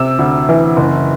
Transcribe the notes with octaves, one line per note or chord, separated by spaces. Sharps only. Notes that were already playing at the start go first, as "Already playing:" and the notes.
Already playing: C3 E6
D2
E3
F#1